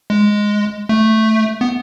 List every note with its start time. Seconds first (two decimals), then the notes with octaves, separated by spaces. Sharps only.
0.10 G#3
0.89 A3
1.61 B3